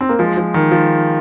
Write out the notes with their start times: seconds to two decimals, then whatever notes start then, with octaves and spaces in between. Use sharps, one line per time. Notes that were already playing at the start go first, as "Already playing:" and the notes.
0.01 C4
0.09 A#3
0.19 F3 G#3
0.37 F3
0.54 D#3
0.71 F3